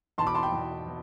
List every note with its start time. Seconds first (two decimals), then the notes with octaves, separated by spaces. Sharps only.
0.18 E2 B2 A5 C6
0.26 B5 D6
0.34 A5 C6
0.43 G5 B5
0.52 E2 B2
0.86 B2